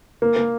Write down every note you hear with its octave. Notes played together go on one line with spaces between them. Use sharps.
A#3
A#3